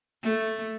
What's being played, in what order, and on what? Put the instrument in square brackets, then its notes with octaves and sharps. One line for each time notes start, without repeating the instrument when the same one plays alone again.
[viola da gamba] A3